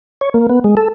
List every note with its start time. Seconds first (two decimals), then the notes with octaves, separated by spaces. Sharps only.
0.21 C#5
0.34 A#3
0.50 B3
0.64 G#3
0.77 A4